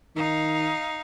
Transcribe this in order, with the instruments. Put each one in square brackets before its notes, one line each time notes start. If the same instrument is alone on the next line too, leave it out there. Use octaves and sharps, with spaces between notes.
[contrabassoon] D#3 [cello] D#4 F5